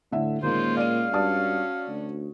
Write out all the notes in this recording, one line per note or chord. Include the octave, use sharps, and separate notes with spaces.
A2 D3 E5
A#2 D#3 G#3 A#3 C#4 F4 C5
D5 F5 D#7
G2 C#4 F#4 D5 A5 D#6
D2